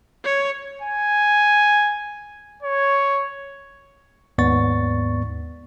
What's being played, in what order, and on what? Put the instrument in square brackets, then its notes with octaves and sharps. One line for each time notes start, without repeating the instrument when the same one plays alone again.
[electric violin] C#5
[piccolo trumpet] G#5
C#5
[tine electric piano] D#2 G#2 B3 D5 C#6 A6